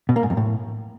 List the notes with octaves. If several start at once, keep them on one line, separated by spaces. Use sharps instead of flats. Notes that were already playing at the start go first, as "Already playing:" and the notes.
B2
A#3
G#2
F2
A2